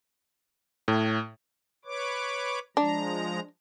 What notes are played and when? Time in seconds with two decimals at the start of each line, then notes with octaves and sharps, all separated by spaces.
0.88 A2
1.85 B4 C#5 D6
2.77 F3 G#3 D4 A#5